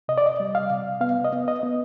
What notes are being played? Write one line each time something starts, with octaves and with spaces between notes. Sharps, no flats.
C3 D#5
D5
D#5
G3
F5
C3
B3 F5
D#5
B3
D#5
B3